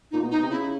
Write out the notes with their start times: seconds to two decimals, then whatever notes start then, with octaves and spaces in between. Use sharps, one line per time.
0.11 A#2 D#4
0.21 B2
0.31 D#4
0.43 C3
0.50 C#3 E4